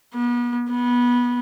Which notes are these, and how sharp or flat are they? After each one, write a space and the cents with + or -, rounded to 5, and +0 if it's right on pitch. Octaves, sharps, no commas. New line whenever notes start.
B3 -35
B3 -20